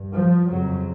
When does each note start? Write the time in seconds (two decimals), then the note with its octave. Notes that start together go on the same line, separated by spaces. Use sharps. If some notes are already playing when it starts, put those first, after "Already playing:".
Already playing: G2
0.14 F3
0.48 F2 C#3 F#3